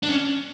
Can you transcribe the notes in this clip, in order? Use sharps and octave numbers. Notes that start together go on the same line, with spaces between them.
D4
C#4